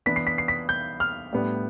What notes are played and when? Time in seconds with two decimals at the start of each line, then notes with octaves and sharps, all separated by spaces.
0.06 E3 B3 D4 B6
0.16 C7
0.27 B6
0.38 C7
0.48 B6
0.69 G6
1.00 F6
1.33 A2 G3 B3 D4